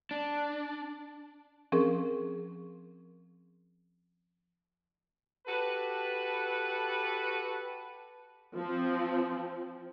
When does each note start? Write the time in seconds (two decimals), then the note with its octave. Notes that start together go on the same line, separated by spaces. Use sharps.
0.11 D4
1.72 F3 C4 C#4 G#4 A#4
5.47 F#4 G4 A4 B4
8.57 F3 C4